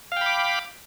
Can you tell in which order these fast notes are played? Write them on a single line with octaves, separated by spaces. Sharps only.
F5 G5 B5 D6